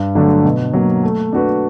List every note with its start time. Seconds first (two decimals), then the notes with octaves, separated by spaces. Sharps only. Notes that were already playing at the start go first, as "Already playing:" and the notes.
Already playing: G2
0.15 D3 F#3 A3 D4
0.44 B2
0.73 F#3 A#3
1.03 A3
1.32 D4 F#4 B4